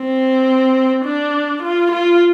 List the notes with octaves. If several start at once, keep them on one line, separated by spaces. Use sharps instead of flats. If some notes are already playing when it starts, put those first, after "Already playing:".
Already playing: C4
D4
F4
F4